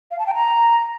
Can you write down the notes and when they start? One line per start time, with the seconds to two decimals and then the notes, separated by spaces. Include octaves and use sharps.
0.11 F5
0.19 A5
0.27 G5
0.34 A#5